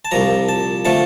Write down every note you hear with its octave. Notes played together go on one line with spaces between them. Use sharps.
A5
C2 A#2 F3 A#5
A5
D3 F3 A3 A5